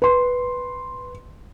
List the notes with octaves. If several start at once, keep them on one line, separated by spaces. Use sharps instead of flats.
B4 C6